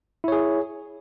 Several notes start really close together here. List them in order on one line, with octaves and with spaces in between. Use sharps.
E4 C#5 G#4